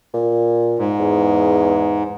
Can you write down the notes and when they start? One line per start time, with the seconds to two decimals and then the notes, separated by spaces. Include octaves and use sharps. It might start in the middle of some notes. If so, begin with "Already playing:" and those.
0.14 A#2
0.79 G#2
1.00 E2